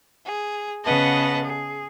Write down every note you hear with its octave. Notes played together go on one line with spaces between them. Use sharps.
G#4
C#3 B3 B4 D#5 F#5 A5
G#4